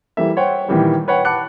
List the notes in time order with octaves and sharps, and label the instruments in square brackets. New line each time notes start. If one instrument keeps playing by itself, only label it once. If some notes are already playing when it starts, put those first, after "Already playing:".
[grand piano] E3 G3 A#3 A4 E5
C5 C#5 F#5 G5
A#2 D#3 E3 G3
B4 C#5 F#5 G5
F#5 A5 B5 D6 F#6 C#7